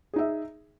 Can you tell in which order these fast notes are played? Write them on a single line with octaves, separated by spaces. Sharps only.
G#4 D#4 E5